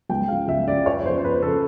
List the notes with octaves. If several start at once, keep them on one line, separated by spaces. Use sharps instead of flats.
C#2 G5
C#3 F3 F5
C#2 E5
C#3 F3 D5
F2 C#5
C#3 F3 C5
C5
F2 B4
C#3 F3 A4